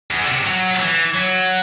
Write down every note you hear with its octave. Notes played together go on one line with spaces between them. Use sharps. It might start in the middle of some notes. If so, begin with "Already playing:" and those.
E2
D3
C3
F#3
E3
F#3